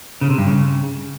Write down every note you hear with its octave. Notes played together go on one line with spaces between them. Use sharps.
C#3
C3
G2
C#3